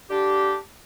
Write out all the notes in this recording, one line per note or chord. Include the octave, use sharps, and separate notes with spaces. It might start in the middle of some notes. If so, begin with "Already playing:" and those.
D3 D4 G4